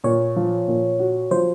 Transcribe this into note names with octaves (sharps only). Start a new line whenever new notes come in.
A#2 C#5
F3
A#2
F#4
F3 C5